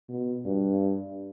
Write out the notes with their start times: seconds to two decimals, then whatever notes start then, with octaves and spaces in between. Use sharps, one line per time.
0.09 B2
0.45 G2